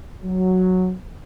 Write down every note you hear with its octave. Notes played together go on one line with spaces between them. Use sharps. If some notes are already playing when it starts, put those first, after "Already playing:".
F#3